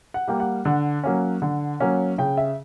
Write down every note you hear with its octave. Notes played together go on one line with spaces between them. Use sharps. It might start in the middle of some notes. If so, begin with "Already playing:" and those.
F#5
G3 A#3 G5
F#5
D3 F#5
F#3 A#3 C#4
D3
F#3 A#3 C#4
C#3 G5
E5